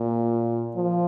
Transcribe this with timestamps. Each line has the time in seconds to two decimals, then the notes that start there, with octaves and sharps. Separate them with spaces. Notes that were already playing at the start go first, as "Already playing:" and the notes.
Already playing: A#2
0.76 F3